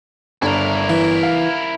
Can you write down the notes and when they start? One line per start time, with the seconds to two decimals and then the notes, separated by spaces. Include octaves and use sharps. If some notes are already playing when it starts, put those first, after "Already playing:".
0.42 G1 D4 E4 A#4
0.89 E3
1.23 F5